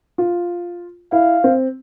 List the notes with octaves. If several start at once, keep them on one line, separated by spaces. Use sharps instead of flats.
F4
E4 F5
C4